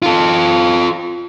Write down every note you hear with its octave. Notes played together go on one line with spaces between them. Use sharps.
F4 A4